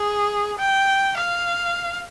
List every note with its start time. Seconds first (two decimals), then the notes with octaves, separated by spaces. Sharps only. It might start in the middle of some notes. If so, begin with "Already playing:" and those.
Already playing: G#4
0.59 G5
1.17 F5